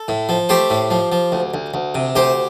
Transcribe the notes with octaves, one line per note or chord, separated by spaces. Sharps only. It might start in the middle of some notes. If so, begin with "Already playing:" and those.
Already playing: A4
A2
F3
A3 G4 C5
A2
F3
F3
D2
D2
D2
C3
D2 G4 C5